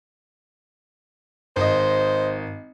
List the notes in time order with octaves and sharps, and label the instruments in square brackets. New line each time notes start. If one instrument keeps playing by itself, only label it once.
[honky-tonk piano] G#1 D#5 [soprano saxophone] C5